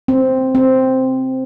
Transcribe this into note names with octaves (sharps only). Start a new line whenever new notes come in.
C4
C4